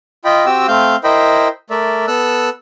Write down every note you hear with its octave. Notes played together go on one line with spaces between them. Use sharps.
F4 D#5 G5 B5
C4 F#4 G4 G5 E6
A3 C4 F5 G6
E4 A#4 C5 D#5 G5 B5
A3 A#4 D5 E5
B3 A4 E6 F#6